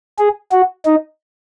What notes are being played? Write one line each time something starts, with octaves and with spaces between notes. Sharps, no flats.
G#4
F#4
D#4